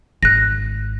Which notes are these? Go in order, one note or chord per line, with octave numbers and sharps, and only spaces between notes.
G#1 F#6 A#6